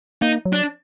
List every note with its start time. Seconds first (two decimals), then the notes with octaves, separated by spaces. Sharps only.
0.22 A#3 D#4
0.45 F#3
0.53 D4